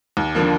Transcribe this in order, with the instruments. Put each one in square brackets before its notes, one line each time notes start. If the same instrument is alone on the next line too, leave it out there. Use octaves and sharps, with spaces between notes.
[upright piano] D#2
D3 F3 A#3